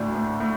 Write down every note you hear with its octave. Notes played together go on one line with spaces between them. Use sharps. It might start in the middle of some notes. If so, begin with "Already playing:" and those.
Already playing: D2 A2 D4
A2
A2